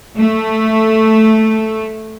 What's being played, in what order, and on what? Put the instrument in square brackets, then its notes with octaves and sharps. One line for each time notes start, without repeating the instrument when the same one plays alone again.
[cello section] A3